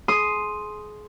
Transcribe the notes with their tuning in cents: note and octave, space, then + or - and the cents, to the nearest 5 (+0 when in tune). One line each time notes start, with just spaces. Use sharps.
G#4 +30 C6 +0 D#6 +0